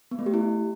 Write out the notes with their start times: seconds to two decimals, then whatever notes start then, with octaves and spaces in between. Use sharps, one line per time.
0.11 B3
0.19 A3
0.26 G4
0.34 E4